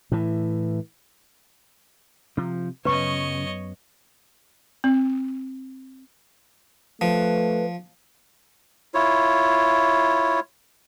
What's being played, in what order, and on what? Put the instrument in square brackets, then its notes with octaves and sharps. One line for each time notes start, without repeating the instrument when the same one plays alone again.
[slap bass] A2 E3
[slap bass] C3 [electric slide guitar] F3
[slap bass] F#2 F#3 B3 [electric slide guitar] C#3 [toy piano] B4 C#6 [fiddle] C#5 D#5
[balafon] C4
[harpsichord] F3 [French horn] A3 [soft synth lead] B4
[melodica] E4 F4 C#5